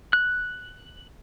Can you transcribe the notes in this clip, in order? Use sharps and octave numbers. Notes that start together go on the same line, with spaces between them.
F#6